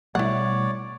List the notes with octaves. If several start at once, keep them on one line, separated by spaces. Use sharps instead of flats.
B2 G3 A3 E4 C#5 D5 F#5